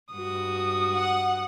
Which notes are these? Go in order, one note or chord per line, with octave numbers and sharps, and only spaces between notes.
G2 F#4 D#6
F#5